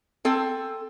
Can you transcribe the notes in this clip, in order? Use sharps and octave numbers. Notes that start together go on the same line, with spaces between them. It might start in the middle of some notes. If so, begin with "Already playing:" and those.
C4 A4 G#5